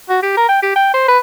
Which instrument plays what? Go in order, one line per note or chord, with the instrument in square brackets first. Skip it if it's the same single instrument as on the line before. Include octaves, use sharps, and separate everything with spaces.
[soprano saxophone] F#4
G4
A#4
G5
G4
G5
C5
B4